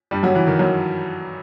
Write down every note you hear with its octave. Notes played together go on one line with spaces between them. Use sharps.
G2 G3
F#2 F#3
E3
D#3
F#2 F#3